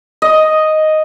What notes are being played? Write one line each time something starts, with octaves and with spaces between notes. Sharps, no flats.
D#5